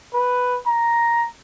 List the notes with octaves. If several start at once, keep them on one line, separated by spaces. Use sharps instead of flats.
B4
A#5